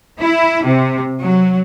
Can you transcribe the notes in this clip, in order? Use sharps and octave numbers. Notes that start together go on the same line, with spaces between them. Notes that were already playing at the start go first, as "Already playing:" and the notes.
E4
C3
F#3